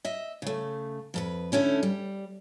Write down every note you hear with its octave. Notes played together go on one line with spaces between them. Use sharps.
D#5 E5
C#3 A3
F2 A4 B4
D3 A3 C#4 E4
G3